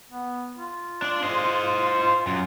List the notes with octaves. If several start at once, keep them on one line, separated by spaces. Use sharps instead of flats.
B3
F4
D4 D5
C5 D#5
F4
F#2